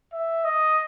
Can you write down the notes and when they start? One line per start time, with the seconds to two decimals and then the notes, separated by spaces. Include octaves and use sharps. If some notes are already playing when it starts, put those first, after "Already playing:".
0.13 E5
0.45 D#5